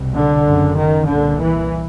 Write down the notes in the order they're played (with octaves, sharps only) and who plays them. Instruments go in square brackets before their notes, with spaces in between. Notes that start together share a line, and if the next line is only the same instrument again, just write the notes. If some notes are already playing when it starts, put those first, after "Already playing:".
Already playing: [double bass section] C2 B2
D3
F#1 F#2 C#3
D#3
C2 A#2 D3
E3